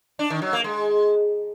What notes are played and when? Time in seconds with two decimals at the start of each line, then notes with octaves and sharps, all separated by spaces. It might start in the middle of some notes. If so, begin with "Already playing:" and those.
0.19 D4
0.30 D#3
0.42 F#3
0.53 A#3
0.64 G#3